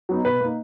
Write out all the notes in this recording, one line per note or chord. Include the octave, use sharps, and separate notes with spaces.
F#3 B3 D#4
B2 B4
A#3 D#4